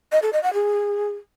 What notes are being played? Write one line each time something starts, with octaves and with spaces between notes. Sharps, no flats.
D#5
A4
D#5
F#5
G#4